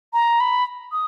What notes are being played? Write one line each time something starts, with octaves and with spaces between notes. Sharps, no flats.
A#5
B5
D#6